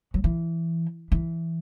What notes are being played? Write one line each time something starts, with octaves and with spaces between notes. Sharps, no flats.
F#3
E3
E3